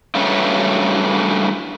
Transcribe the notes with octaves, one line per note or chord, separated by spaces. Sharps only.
G2 C#3 E3 F#3 A3 C#4